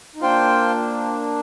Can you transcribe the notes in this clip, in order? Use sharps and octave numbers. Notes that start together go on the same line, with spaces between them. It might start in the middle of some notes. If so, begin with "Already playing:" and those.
D#4
A#3 D4 F4 C5 G5